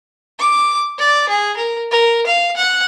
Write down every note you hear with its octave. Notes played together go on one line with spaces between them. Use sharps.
D6
D5
G#4
A#4
A#4
F5
F#5